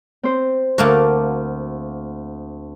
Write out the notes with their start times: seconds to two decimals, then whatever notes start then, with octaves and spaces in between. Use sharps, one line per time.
0.23 C4 C5
0.78 D2 A3 A#3 F#4 F5 D6